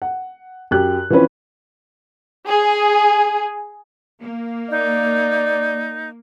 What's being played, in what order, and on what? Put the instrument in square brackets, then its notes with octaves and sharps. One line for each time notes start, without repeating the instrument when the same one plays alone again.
[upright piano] F#5
F#2 G4 F#6
E3 F3 C4 C#4 B4
[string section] G#4
[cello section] A#3
[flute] D#4 [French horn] D5